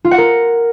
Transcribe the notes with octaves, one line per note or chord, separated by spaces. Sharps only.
F4
F#5
A#4